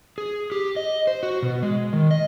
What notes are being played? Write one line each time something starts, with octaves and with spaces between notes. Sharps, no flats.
G#4
G4
D#5
C5
F#4
B2
G#3
D#3
D#5